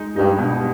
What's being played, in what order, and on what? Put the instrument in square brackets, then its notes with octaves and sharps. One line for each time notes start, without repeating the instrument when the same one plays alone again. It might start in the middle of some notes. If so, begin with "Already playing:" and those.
Already playing: [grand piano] G#3 D#4
[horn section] G2 [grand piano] D#4
[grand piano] B2